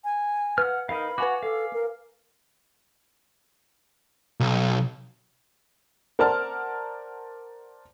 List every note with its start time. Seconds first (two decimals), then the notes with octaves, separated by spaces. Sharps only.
0.04 G#5
0.58 B4 F#5 F6
0.89 D#4 A#4 F5 B5
1.18 F#4 B4 F#5 G#5 D6
1.43 A4 F5
1.73 A#4
4.40 B1
6.19 A#4 C5 D5 F#5 A5 F6